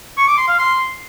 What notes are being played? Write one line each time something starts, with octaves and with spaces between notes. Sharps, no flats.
C#6
D6
C6
F5
C6